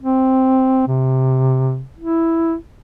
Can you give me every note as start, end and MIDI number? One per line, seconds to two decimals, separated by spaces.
0.01 0.83 60
0.87 1.82 48
1.99 2.55 64